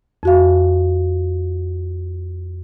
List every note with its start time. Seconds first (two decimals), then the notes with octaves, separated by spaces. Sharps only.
0.23 F2 F#4 F5